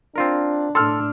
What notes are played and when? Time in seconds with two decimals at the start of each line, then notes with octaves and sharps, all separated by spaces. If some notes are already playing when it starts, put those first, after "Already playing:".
0.16 C4 D4 F4 A#4
0.75 A2 D4 A4 C6 E6 F6